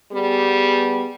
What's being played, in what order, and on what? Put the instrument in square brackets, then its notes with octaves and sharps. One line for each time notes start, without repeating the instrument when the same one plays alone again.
[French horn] G3 [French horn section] B3 G4 G#4